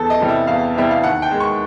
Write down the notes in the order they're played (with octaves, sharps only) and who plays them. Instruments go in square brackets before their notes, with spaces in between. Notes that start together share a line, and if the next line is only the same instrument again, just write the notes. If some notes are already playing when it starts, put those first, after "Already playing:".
Already playing: [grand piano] E2 A4
D#5
C3 E3 G3
E5
E2 F5
C3 E3 G3 E5
F5
D#2 F#5
G5
D#3 G#3
C#6